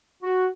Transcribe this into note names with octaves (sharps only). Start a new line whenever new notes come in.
F#4